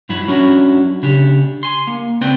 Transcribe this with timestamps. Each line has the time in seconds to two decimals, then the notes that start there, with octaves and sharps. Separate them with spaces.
0.09 G2 F#3 E4 B5
0.28 F#3 C#4 D4 E4 F#4
1.03 C#3 D4 G4
1.63 G#5 C6
1.87 A#3
2.21 C#2 C4 B4 D5 G5